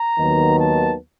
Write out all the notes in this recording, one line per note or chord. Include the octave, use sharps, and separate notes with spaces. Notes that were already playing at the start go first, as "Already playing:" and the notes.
Already playing: A#5
D#2 D#3 F#3 B3
A5